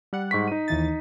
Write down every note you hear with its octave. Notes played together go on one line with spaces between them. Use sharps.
G3 F#5
G#2 C#6 B6
D#4 D#7
D#2 E3 A6